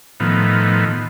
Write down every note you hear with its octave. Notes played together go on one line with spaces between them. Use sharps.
A2 D#3 F3 B3